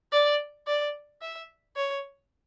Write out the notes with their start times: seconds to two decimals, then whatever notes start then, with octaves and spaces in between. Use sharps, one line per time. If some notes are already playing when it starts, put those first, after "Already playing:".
0.12 D5
0.67 D5
1.22 E5
1.76 C#5